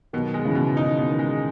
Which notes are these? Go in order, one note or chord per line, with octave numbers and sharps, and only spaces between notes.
B2 D#3 F#3
G#3
C#3 E3
B2
D#3 D#4
B2
D#3
G#3